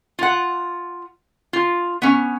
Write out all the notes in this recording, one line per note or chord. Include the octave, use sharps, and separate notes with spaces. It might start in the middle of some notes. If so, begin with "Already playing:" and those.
F4 F#5
F4
B3 C#4